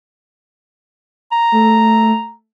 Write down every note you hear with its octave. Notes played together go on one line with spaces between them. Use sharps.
A#5
A3